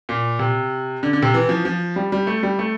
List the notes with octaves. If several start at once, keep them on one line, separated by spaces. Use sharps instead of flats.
A#2
C3
D3
D3
C3
E3
F3
F3
G3
G3
A3
G3
A3